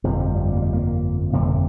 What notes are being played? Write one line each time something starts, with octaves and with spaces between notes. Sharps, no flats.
G1 F2 C3 F3
G3
G3
A#3
G3
A#3
G1 F2 C3 A#3
C4
A#3